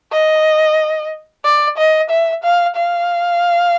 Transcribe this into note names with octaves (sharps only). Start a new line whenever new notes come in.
D#5
D5
D#5
E5
F5
F5